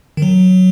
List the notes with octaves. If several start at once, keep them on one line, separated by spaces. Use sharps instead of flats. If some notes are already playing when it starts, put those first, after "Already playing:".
D#3
F#3